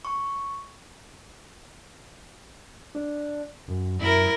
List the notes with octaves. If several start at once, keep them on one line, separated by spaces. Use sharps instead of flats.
C#6
D4
F#2
F#2 E4 A#4